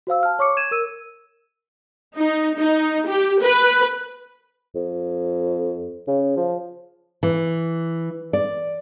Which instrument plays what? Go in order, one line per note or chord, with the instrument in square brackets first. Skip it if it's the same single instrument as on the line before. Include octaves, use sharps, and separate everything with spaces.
[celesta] F#4 C5 F5 E6
A5 F6
C#5 C#6 D6 C#7
G#6 D#7 E7
A#4 E6 D#7
[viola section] D#4
D#4
G4
B4
[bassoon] F2
C#3
F3
[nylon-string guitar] E3
D5